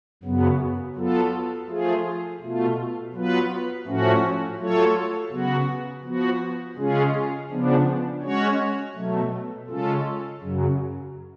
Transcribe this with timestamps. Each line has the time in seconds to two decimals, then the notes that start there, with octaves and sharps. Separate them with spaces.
0.23 F#2 C#3 F#3 B3
0.96 F#3 B3 F4 A4
1.68 F3 A3 F4 G#4
2.40 B2 A3 F4
3.13 F#3 B3 F4 B4
3.86 A2 F3 A3 C#4 F#4
4.59 F#3 A3 F4 A4 C#5
5.31 C#3 F#3 B3 F#4
6.04 F3 B3 F#4
6.76 C#3 G#3 C#4 F4 G#4
7.50 C#3 F3 B3 D4
8.22 G#3 C#4 F#4 C#5
8.95 B2 F#3 A3
9.67 C#3 G#3 C#4 F4 A4
10.40 F#2 C#3 F#3